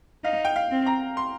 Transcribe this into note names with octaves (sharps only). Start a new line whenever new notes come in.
D#4 F5
G5
F5
C4
A#5
C6